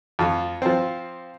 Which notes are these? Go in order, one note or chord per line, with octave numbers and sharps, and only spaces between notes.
F2 F4
F3 C4